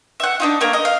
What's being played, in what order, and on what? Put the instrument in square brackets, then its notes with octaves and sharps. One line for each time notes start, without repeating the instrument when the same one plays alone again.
[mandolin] E5 F#5
D4 D#4 F4
A3 A#3 A#4
D#5
F5